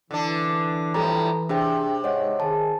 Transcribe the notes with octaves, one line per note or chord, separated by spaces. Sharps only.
D3 E3 D4
F2 A2 G3 A4 A#5
C3 D4 G#4 G5
G#2 G#3 C#5 D#5 F#5
D#3 G#4 A5